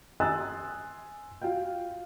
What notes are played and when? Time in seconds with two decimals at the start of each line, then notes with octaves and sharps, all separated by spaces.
0.20 G#5 C6 D#6 E6 F#6 A6
1.42 F4 F#4 F5 G5